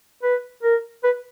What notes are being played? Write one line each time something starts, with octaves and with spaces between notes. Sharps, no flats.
B4
A#4
B4